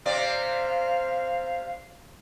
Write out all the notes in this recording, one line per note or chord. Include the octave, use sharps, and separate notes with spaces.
C3 C4 D5 F5